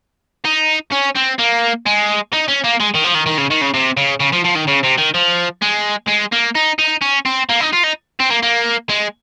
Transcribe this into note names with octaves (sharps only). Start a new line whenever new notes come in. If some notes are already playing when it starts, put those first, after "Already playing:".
D#4
C#4
C4
A#3
G#3
D#4
C#4
A#3
G#3
D#3
F3
D#3
D#3
C#3
D#3
C#3
C3
C#3
C#3
F3
F3
D#3
C#3
C3
D#3
F3
G#3
G#3
A#3
D#4
D#4
C#4
C4
A#3
D#4
F4
D#4
C4
A#3
A#3
G#3